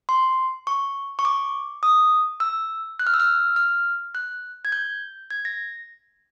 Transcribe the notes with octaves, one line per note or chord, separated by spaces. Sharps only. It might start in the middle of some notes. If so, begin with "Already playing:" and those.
C6
C#6
C#6
D6
D#6
E6
F#6
F6
E6
F6
F6
F#6
G#6
G6
G#6
A#6